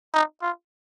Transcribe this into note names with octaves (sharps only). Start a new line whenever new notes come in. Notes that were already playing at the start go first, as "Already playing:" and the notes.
D#4
F4